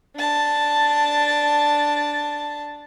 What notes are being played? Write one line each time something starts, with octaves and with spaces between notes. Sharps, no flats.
D4 A5